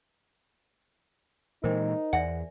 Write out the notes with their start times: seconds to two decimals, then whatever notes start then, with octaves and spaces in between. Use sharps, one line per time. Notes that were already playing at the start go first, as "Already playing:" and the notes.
1.64 A#2 E3 G#3 D#4 A#4 C5 G5
2.13 E2 D5 E5 F#5 G#5